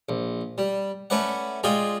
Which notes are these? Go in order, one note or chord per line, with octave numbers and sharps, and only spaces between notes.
A#1
G3
A3 C#4 B4 D5 F#5
G#3 F4 G#4 D5 G5